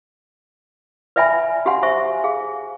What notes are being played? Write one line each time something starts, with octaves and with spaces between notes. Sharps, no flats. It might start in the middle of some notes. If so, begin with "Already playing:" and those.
B4 D5 E5 G5 G#5 B5
F#4 G4 F5 F#5 G#5 C6
C5 E5 G#5 C#6
G#4 F5